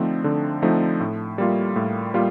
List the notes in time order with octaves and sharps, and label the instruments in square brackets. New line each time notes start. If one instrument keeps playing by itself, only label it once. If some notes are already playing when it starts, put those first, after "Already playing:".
Already playing: [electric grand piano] D3 F3 A3 C4 D#4
D3
F3 A3 C4 D#4
A2
G3 A#3 F4
A2
G3 A#3 F4